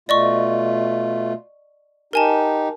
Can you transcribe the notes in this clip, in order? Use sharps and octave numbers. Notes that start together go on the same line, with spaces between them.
B2 A3 F4 D5 D#5 C#6
D#4 G4 A#4 G#5 A5